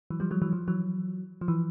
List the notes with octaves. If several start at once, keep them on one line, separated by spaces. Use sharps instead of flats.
E3 F#3
F3 G3
F#3 G#3
E3 F#3
F3
E3 F#3
F3
E3